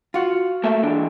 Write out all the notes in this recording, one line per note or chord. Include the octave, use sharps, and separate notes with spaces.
F4 F#4
A3 A#3 E5
E3 D4